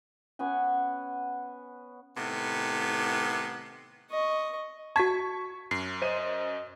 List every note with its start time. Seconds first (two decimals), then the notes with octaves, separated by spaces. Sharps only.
0.39 B3 C#4 F#5 G#5
2.17 A2 C3 D#3 B3
4.11 D#5 C#6
4.96 F#4 A5 C#6 G#6 B6
5.71 F#2 C7
6.02 C5 D#5 D#7